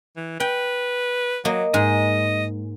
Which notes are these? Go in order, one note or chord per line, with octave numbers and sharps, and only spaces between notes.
E3
B4 G5
F#3 A#3 D#5
G#2 D#5